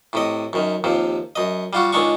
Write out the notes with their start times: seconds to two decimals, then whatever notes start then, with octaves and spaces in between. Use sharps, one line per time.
0.13 A2 C3 D#5
0.53 F#2 D#3
0.84 D#2 C3 F3
1.36 F#2 D#5
1.73 G3 F4 F#4
1.93 C#2 D#3 G#3 D4 C#6